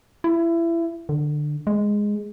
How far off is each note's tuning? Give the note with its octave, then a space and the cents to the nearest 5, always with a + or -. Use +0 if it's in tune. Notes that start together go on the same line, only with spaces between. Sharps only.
E4 +25
D3 +20
G#3 -5